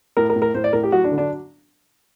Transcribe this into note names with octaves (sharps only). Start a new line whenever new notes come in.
A2 A#4
A#4
A2
A#4
A2 C5
D5
A2 A#4
G4
F#3 F#4
D4
D3
D4